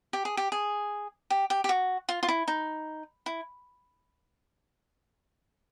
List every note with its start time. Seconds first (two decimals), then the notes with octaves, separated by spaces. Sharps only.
0.13 G4
0.25 G#4
0.37 G4
0.52 G#4
1.30 G4
1.50 G4
1.64 G4
1.69 F#4
2.09 F4
2.23 F4
2.28 E4
2.48 D#4
3.26 E4